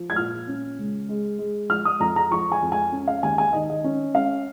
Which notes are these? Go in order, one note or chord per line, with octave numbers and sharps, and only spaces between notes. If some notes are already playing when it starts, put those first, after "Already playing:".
Already playing: F3
G#6
A#2 F6
C#4
C#2
G#3
G#3
F3 F6
D#6
F2 A#5
A#5
F3 C#6
G#5
F2
G#5
C#4
F5
D#2 G#5
G#5
D#3 D#5
D#5
C#4
C#4 F5